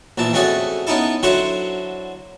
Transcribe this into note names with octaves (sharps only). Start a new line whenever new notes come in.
A#1 A#2 E3 A5
F2 A3 C#4 F#4 G#4 D5
B3 C#4 D#4 E4 A4
D3 F#3 E4 F#4 C5 C#5